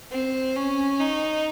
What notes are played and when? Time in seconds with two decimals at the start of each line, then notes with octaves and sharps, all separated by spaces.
0.12 C4
0.56 C#4
0.99 D#4